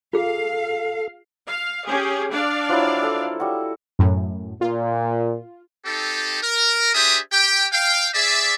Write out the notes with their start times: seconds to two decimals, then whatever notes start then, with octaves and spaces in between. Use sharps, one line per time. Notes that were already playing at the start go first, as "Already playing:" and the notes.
0.13 F4 G#4 A4 F5
1.48 F5
1.86 C#4 G4 G#4
2.33 D4 D5 F5
2.69 F3 F#3 E4
3.03 A4
3.40 G3 F#4
3.99 F#2 A2
4.61 A#2 F4
5.86 C4 D#4 G4 A4
6.42 A#4
6.95 D4 G4 G#4 C5 E5 D#6
7.32 G4 G5
7.72 F5 G5
8.14 G#4 D5 E5